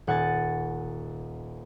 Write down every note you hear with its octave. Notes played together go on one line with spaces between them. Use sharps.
D#1 F#5 G#5 A6